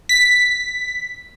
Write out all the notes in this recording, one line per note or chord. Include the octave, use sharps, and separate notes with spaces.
B6